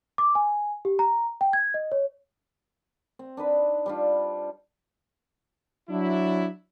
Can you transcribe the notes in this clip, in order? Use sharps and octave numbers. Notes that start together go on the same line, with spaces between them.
D6
G#5
G4
A#5
G5
G#6
D#5
C#5
C4
D4 D#4 B4 B5
G3 D4 F4
F#3 D4 E4